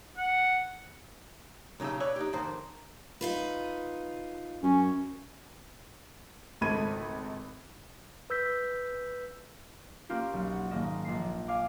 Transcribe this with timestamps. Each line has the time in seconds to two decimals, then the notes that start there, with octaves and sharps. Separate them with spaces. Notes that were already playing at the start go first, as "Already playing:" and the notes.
0.18 F#5
1.80 B1 C#3 D#4 G4 E5
2.00 B4 C#5 D5 E5
2.16 D#4 G4
2.33 F2 G#2 D#3 C5
3.21 D#4 F4 B4
4.63 F#2 C#4
6.61 G#1 C#2 A3 B5 G#6 D#7
8.30 B4 E6 G6 B6
10.09 A#3 C4 C#4 F4 G4
10.33 B1
10.52 F#5
10.71 G#1 A#3 D#5 A#6 E7
11.05 A#1 C7
11.48 F5 G#5 D6